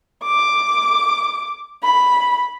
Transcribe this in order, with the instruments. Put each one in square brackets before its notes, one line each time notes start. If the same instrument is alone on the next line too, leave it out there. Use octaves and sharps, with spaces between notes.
[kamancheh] D6
B5